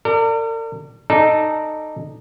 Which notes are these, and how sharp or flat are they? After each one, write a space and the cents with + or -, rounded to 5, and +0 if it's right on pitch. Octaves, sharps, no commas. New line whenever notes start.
A#4 -45 D5 +5
D#4 -15 A4 +0 D5 +0